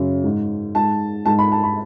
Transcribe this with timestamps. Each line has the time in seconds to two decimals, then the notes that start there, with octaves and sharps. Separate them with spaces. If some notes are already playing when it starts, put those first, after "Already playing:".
Already playing: F#2 C#3
0.24 G#2
0.75 G#2 A5
1.26 G#2 A5
1.39 B5
1.52 A5
1.63 B5